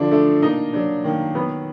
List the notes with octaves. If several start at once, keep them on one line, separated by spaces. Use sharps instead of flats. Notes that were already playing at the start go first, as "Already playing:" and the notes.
Already playing: D3 F3 D4
A3 D4
A#3 D#4
F#3 D4
D#3 A#3
F#3 B3